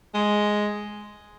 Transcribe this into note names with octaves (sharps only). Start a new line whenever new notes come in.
G#3